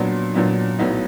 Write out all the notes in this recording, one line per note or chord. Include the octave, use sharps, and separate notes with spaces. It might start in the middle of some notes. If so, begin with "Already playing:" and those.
Already playing: A#2 F#3 B3 D4
A#2 F#3 B3 D4
B1 A2 F#3 B3 D#4